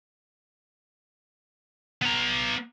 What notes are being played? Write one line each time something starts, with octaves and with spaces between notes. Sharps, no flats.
B3 A#5